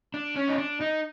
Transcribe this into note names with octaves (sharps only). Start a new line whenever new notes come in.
D4
C#4
D#4
D4
D#4